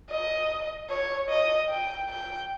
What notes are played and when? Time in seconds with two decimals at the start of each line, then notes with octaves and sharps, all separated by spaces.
0.11 D#5
0.90 C#5
1.29 D#5
1.69 G5
2.09 G5